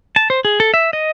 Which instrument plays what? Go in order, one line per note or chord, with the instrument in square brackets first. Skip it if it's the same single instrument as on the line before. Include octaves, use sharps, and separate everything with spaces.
[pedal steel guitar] A5
C5
G#4
A4
E5
D#5